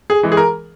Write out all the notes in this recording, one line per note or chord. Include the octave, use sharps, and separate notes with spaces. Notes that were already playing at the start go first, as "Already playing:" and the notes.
G#4
E3 G#3
G#4
A#4